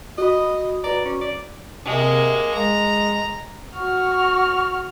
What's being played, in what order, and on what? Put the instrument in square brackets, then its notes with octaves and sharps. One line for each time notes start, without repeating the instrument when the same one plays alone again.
[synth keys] F#4 B5 [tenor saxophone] D#5
[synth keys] F#4 B4 A#5 [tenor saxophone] D5
[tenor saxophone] C#4
D5
[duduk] C3 [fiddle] G#3 A#3
[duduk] G#3 [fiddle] A#5
[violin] F#4 F6 [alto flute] C#6